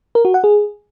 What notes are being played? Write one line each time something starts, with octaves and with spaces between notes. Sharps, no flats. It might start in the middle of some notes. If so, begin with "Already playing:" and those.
A#4
F#4
F#5
G#4